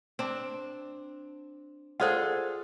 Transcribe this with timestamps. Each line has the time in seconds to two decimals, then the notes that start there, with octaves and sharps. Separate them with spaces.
0.19 C4 D4
2.00 F4 G#4 A4 C5 D5 F#5